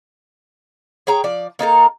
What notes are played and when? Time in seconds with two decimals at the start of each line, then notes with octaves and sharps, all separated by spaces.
1.07 G#4 C#5 G5 A#5
1.24 F3 D5
1.59 A#3 D#4 A4 A#4